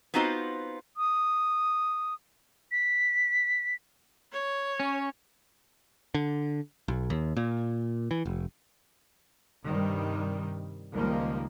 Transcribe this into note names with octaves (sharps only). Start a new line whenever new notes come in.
B3 C4 D#4 F4 F#4 C5
D#6
B6
C#5
C#4
D3
B1
D#2
A#2
E3
F1
G2 C3 D#3 G3
C#2 D#3 F3 G3 A#3